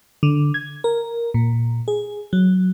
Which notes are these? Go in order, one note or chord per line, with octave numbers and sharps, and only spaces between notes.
D3
G#6
A#4
A#2
G#4
F#3